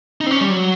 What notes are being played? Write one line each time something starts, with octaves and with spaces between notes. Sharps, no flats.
D#4
C4
C#4
G3
F#3